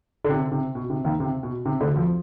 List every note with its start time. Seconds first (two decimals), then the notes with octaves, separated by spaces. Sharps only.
0.24 D3
0.29 C3
0.52 C3
0.75 B2
0.90 C3
1.04 D#2 D#3
1.20 C3
1.43 B2
1.65 C3
1.80 D2 D3
1.96 F2 F3